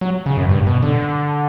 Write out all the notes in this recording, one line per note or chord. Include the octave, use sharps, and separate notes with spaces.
F#3
C#3
F#2
G2
B2
D3